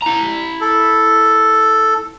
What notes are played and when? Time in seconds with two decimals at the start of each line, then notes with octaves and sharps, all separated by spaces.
0.02 E4 A#5
0.61 A4